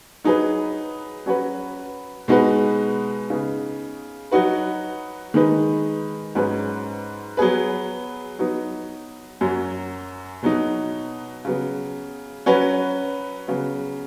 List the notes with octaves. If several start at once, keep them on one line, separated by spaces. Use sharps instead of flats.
F#3 D#4 G#4 B4
F#3 C#4 F#4 B4
B2 G#3 D#4 F#4 B4
C#3 B3 D#4
F#3 D#4 F#4 B4
D#3 G#3 D#4 B4
G#2 F#3 C#4 G#4 B4
F#3 B3 G#4 B4
F#3 B3 D#4
F#2 F#3 C#4
B2 F#3 D#4
C#3 F#3 B3
F#3 C#4 F#4 B4
C#3 F#3 B3